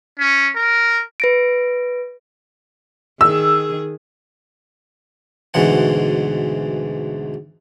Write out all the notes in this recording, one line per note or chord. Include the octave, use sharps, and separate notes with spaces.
C#4
A#4
B4 A#6 D7
D#3 G#4 E6
D2 G#2 B2 E3 F#5